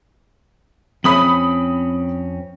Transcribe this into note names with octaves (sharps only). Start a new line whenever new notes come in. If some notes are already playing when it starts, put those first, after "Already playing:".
F2 C4 C#4 B5 D#6 F#7